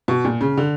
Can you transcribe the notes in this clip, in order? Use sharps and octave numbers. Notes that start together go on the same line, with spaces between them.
B2
A#2
C#3
D3